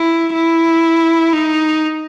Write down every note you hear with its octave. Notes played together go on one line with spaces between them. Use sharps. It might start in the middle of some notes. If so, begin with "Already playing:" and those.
Already playing: E4
E4
D#4